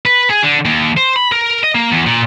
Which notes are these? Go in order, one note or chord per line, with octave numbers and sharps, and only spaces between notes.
B4
G#4
D3
D#2
C5
B5
A#4
D#5
A#3
E2
A#2